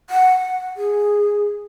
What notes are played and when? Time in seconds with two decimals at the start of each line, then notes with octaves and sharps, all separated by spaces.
0.10 F#5
0.77 G#4